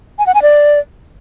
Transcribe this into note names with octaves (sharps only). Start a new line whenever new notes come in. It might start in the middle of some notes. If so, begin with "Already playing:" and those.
G#5
F#5
G#5
D5